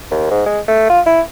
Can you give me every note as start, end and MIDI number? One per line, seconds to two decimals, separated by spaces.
0.11 0.28 39
0.31 0.42 44
0.46 0.60 56
0.68 0.89 57
0.89 1.00 65
1.06 1.21 64